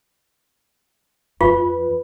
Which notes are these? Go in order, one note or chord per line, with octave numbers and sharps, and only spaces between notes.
F2 F3 F4 B4